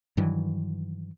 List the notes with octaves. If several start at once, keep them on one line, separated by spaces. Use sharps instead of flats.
G2 D#3 E3 F#3